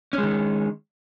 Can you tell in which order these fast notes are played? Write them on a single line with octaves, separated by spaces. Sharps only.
C#4 G#3 D#3